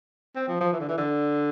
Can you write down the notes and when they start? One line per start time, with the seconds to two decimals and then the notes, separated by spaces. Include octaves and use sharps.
0.35 C4
0.48 F3
0.60 F3
0.73 E3
0.80 D3
0.88 E3
0.98 D3